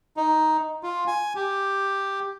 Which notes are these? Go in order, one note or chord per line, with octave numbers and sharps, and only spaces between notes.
D#4
F4
G#5
G4